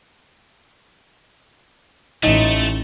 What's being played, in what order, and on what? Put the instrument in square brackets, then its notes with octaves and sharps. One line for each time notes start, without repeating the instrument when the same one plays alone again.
[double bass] A1 [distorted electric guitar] A3 [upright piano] D#4